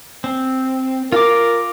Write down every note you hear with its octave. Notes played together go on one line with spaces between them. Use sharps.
C4
F4 A#4 D6